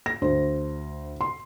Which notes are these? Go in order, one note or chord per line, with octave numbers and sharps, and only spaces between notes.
A#6
D2 C5
C6